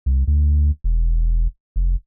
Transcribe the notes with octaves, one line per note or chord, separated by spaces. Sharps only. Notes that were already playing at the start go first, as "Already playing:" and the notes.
C2
D2
E1
F1